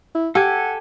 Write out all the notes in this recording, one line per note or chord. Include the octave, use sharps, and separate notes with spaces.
E4
G4 A4 F#5 G#5